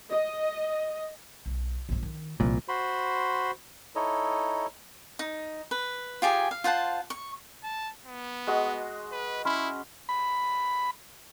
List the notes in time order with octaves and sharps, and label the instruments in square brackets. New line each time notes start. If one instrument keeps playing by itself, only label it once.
[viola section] D#5
[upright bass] B1
A#1 G2
D#3
[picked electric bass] C2 A#2 [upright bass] F3 C4
[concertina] F#4 C5 B5 C6
D#4 E4 A4 C#5 D#5
[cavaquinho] D#4
B4
F4 G4 G#4 G#5
F5
F4 C5 F#5 A5
C#6
[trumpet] A5
B3
[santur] G#3 F#4 D#5
[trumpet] B4
[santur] C#4 B5 C6 [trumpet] E4
[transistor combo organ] B5